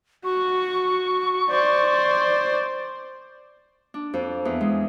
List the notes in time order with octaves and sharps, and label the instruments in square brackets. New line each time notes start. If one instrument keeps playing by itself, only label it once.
[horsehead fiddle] F#4 [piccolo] C#6
[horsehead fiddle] C5 D5
[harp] D4
F2
E2
G#3